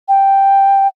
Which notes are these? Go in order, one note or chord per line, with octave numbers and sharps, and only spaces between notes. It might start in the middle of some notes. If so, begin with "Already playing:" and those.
G5